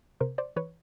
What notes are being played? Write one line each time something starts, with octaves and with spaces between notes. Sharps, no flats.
C3 A#4 C5
C5 D5
E3 B4 C#5